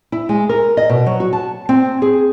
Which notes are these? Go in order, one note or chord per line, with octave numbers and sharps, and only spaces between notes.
E4
G#3
A#4
D#5
B2
F#3
F#4
A5
C4
G#4